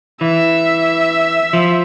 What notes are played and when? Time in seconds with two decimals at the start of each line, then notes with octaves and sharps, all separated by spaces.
0.21 E3 E5
1.53 F3